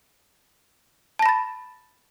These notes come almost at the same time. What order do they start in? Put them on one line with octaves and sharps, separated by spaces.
A5 A#6 B5 A6